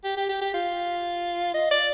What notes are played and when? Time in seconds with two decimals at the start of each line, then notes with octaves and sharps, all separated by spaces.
0.04 G4
0.17 G4
0.29 G4
0.41 G4
0.54 F4
1.54 D#5
1.71 D5